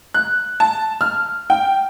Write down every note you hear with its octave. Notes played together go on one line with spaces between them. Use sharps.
F#6
A5
F6
G5